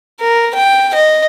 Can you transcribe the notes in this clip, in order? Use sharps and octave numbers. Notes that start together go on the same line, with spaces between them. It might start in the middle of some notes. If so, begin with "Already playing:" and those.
A#4
G5
D#5